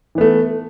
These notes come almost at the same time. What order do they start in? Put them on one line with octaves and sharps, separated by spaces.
E3 B3 A3